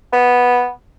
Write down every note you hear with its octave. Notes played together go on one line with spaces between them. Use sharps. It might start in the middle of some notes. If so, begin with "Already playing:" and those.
B3